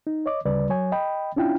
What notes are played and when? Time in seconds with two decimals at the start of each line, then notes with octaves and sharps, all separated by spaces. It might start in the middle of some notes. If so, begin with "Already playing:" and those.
0.07 D#4
0.26 C#5 D#5 D6
0.45 D2 C#3 G3 B4 D5
0.69 F#3 C#5 G#5
0.92 D#5 G5 B5
1.36 C#4 D4 E4 F4 G5